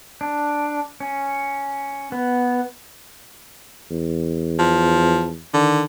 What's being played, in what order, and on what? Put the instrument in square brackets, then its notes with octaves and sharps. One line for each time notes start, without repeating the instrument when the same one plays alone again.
[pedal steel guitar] D4
C#4
B3
[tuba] E2
[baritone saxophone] F3
[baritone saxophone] D3 [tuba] D#3